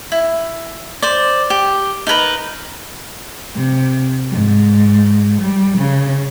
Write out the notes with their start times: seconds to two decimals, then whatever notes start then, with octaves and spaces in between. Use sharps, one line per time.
0.12 E4
1.02 C5 D5
1.50 G4
2.07 D#4 A#4 B4 A#5
3.55 C3
4.32 G#2
5.42 G3
5.78 C#3